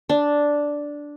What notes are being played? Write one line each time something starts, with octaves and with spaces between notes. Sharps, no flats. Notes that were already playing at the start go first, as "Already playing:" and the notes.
D4